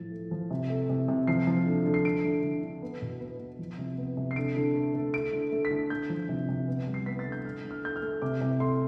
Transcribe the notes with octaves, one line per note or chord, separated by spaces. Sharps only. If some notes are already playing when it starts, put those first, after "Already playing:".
Already playing: A2 F3 A6
A3
F3
C3
A3
C3
C3
F3 C7
F3
D3
D3
C7
A3 D7
D3
D3
D3
B3
B2
B3
B3
F3
C3
B3
C3
C7
D3 D7
D3
A3
A3
A3 D7
D3
A3
B6
D3
A3 G6
F3
C3
C3
B3
G3
C7
B3 B6
A6
D3
G6
A3 F6
D3
F6
A3 G6
F6
A3
C3 D6
C3
A3 C6